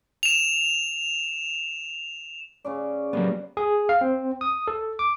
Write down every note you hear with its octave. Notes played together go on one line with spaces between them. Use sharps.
E7 F7
C#3 C#4 D5
F#3 G3 A#3 B3
G#4
F5
C4
D#6
A4
D6